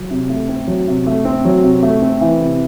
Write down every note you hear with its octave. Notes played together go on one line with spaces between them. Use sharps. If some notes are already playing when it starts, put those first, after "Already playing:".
Already playing: F#3
C3
A3
C4
F#3
C3
A3
C4
F#3
C3
A3
C4
E3
C3